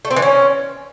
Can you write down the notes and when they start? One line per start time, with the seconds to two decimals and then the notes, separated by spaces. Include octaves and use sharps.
0.05 A3
0.11 C4
0.16 E3
0.22 C#4